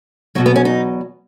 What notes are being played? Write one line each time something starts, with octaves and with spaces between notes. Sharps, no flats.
E2 B2 F#3 F#4
B3
C#4
D#4